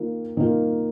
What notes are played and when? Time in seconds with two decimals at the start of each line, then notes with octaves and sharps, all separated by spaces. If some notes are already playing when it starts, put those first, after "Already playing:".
Already playing: D#3 A#3 F4
0.37 D#3 A#3 F4